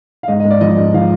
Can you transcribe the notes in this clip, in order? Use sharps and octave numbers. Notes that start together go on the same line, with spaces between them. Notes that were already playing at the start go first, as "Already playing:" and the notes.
F5
G#2 D#5
D#5
G#2
D5
F3 D#5
G#2
F3 F5